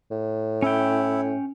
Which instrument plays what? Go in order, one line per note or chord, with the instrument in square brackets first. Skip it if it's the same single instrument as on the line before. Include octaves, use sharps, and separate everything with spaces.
[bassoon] A2
[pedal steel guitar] C#4 G5 [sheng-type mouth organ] E4